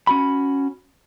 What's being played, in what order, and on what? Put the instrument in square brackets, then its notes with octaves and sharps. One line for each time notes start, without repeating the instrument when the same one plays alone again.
[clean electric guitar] C#4 F#4 B5